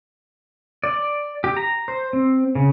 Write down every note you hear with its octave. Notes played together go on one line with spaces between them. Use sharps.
D5
G4
A#5
C5
C4
C#3